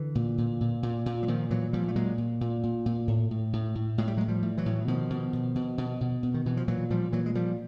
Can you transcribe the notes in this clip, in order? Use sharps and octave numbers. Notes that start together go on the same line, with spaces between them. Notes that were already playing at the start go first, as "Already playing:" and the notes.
Already playing: D3 E3
A#2
A#2
A#2
A#2
A#2
F#3
A#2 D#3 F3
A#2 E3 F#3
A#2 F3 G3
A3
A#2 F#3 G#3
A#2
A#2
A#2
A#2
A2
A2
A2
A2
A2 G#3
G3
F#3 G#3
A2
F3 G3
A2
E3 F#3
A2
B2 D#3 F3
B2
B2
B2
B2
B2
B2
D#3
B2 E3
F3
A#2 E3 F#3
A#2 F3 G3
A#2 E3 F#3
G#3
A#2 F3 G3